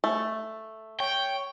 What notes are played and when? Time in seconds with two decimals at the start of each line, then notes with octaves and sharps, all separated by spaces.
0.04 A3
1.00 C#5 G5